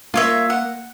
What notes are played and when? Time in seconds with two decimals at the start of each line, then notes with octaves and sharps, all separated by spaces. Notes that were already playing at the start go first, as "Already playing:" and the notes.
0.14 A#3 F4 A#4 C#5 E5
0.50 F#5